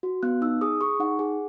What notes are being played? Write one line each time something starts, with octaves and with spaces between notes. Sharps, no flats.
F#4
B3 F#6
D#4 E6
G#4 D#6
G#4 C#6
D#4 F#5
G#4